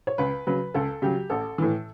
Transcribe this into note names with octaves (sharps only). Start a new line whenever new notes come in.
C#5
C#2 B4
C#3 F#3 B4
C#2 A4
C#3 F#3 G4
A1 A4
A2 E3